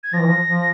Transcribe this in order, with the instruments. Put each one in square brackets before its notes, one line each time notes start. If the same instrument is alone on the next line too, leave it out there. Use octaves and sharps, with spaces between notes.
[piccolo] G#6
[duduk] F3 [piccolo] A#6
[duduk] E3
F3
F3